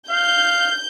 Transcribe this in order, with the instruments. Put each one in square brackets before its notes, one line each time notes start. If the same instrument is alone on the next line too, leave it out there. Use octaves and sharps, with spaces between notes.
[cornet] F5 [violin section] G6